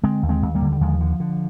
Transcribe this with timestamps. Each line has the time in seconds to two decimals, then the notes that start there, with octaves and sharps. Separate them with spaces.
0.03 D3 G#3 C4
0.23 D#2
0.29 G#3 C4
0.42 D#2
0.55 G3 A#3
0.62 D3
0.72 G3
0.81 D#2 F3 G#3
1.01 D3
1.20 D3